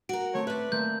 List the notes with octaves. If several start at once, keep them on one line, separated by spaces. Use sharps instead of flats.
F#4 A#4 D7
A3 C4 C#4 C#5
A4 B4 D5 E5
A3 A#3 C4 G6